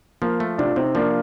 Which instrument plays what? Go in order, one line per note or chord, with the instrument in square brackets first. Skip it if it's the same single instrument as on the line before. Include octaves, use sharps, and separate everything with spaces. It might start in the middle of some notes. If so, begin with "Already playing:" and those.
[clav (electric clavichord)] F3 [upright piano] A#3
[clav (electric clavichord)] A3
[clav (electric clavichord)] C3 [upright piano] D4 F4
[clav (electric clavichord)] C3 [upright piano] C4 D#4
[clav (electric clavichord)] F3 [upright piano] A#3 D4